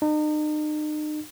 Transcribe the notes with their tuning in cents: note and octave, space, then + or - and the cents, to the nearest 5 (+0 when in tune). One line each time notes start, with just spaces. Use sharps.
D#4 -40